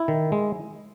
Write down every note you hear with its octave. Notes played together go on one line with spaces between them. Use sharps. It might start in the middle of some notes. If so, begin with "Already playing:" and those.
Already playing: E4
D#3
G#3